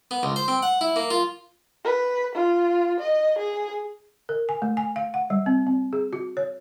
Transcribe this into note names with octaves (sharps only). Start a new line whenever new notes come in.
B3
C#2
C5
C4
F#5
E4
A#3
F4
B4
F4
D#5
G#4
A#4
G#5
A3
G#5
F5
F#5
G3
C4
C4
G#4
F#4
C#5